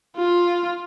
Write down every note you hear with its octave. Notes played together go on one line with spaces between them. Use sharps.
F4